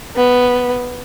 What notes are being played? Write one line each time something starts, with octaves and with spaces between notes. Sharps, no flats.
B3